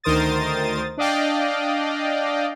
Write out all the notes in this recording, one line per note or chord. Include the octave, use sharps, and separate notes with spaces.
D2 D#3 A#4 C5 D#6 A6
D4 D5 D#5 F5 G5